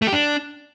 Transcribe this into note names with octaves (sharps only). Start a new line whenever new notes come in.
A3
G4
D4